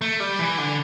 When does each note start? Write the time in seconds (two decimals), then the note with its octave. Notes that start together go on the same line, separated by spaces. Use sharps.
0.01 A3
0.20 G3
0.39 E3
0.58 D3